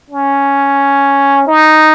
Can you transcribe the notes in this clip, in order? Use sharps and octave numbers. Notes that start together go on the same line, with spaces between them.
C#4
D#4